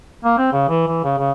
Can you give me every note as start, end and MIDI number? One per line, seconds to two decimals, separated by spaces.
0.24 0.35 58
0.38 0.50 60
0.53 0.66 49
0.69 0.87 52
0.88 1.03 52
1.04 1.16 49
1.18 1.32 49